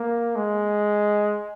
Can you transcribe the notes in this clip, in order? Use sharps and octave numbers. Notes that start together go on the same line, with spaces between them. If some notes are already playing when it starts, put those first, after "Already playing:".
Already playing: A#3
G#3